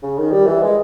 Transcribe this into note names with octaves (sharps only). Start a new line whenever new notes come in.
C#3
D#3
G3
E3
G#3